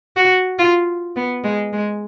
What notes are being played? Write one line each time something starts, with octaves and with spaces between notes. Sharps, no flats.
F#4
F4
B3
G#3
G#3